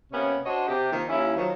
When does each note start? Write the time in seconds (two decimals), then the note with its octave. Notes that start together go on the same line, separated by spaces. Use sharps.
0.13 C3 A#3 B3 C#4
0.45 D4 F#4 C5 C#5 D#5
0.68 C3 G4
0.92 D#3 F3 A#3
1.09 D#2 C#4 E4
1.36 D#3 F3 F#3